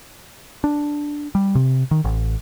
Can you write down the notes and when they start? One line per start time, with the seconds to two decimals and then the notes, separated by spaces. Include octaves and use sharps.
0.64 D4
1.35 G3
1.55 C3
1.91 D#3
2.04 A1